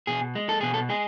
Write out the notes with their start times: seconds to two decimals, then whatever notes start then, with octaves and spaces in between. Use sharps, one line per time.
0.07 B2 G#4
0.35 G#3
0.49 A4
0.61 B2 G#4
0.74 A4
0.89 G#3 G#4